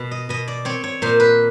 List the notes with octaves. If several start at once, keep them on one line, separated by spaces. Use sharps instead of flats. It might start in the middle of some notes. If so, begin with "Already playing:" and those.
Already playing: B2
D#5
B2 D#5
D5
C4 C#5
C#5
A#2 C5
B4